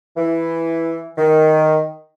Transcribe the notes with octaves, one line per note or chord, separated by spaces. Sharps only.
E3
D#3